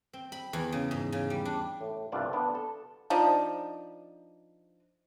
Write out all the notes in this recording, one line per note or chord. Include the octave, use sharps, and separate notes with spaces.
C4
B5
E2
C#3
G#2
C#3
G3
D4
A2
C2 G2 F4 D5 E5 F#5
B3 D4
A4
F3 D4 D#4